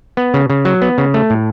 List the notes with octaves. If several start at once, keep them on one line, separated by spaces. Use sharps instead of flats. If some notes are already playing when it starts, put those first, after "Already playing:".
B3
C#3
C#3
F#3
B3
C#3
A3
A2